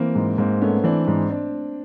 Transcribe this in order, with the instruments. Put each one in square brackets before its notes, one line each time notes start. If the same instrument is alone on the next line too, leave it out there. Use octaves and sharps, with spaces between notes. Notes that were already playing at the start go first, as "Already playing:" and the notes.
Already playing: [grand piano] E3 [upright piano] A#3 C4
[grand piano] G#2
[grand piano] G#2 [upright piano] A#3 C4
[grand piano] A3 [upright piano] B3 C#4
[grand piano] E3 [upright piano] C4 D4
[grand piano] G#2
[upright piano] C4 D4